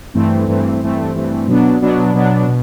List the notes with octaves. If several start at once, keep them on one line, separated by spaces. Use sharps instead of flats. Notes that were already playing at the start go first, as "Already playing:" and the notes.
G2 E3 A3 C4
G2 E3 A3 C4
G2 E3 A3 C4
G2 E3 A3 C4
B2 F#3 B3 D4
B2 F#3 B3 D4
B2 F#3 B3 D4
B2